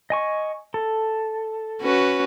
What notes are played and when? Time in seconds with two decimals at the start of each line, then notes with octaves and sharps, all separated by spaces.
0.10 D#5 G#5 C#6
0.74 A4
1.81 C#4 F#4 B4